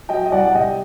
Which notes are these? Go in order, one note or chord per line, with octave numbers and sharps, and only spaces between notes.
F#3 D#5 G5
D#5
C2 D5 F#5
F#5
C3 D#5 G5